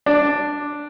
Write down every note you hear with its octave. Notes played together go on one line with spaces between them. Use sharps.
D4